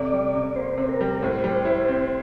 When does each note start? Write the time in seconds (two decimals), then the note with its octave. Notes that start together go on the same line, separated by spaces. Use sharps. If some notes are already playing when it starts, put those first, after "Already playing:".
Already playing: C3 A3 D5
0.13 G3
0.35 C3
0.56 A#3 C5
0.78 C3
0.89 A#4
1.01 G3
1.23 A2 C5
1.44 G3
1.65 E4
1.88 C4